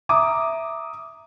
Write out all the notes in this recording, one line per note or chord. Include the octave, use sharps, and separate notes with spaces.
E5 A#5 D6 D#6